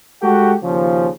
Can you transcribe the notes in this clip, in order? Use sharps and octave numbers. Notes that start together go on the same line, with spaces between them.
G#3 F#4 G4 A4 F#5
D#2 C#3 F3